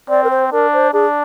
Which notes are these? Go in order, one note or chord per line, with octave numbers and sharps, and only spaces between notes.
C4 D5
A#4
C5
D4 A#4
C5
D4 G#4